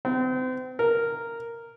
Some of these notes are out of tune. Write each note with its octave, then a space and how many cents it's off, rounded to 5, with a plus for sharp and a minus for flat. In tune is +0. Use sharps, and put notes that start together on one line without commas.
C4 -35
A#4 -5